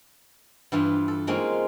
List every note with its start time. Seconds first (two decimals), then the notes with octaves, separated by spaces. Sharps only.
0.72 G2 E3 F4
1.08 A4
1.27 G#3 A#3 C4 C#4 D#4 F4